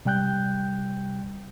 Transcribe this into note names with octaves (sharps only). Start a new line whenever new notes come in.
C3 G3 G5 F#6 G6